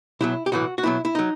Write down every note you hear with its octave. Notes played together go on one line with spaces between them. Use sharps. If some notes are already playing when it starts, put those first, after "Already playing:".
B1 B2 F#3 E4
G4
B1 A2 E3 F#4
F#4
B1 B2 F#3 E4
E4
F#3 D#4